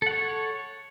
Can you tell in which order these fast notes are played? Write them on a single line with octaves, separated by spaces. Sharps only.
A4 F#5 C#5